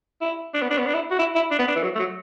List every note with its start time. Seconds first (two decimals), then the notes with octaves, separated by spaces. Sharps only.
0.21 E4
0.54 D4
0.62 B3
0.70 D4
0.78 B3
0.86 D4
0.94 E4
1.11 F#4
1.19 E4
1.35 E4
1.51 D4
1.59 B3
1.67 D4
1.76 E3
1.83 F#3
1.95 A3
1.99 F#3